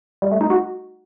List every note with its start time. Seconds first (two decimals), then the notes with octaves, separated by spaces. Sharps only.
0.22 G3
0.31 A3
0.41 D#4
0.50 F#4